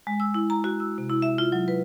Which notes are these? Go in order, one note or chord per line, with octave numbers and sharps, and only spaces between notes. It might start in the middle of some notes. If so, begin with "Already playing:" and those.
G#3
E6
E4
A#5
F#4
E6
C3
E4
E5
F4
F#3
B4